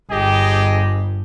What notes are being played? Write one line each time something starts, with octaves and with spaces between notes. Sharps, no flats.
G1 G4 G#4 D#5